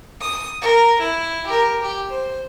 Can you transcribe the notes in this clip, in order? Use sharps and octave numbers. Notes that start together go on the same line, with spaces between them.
D#6
A#4
E4
G4 A#4
G4
C5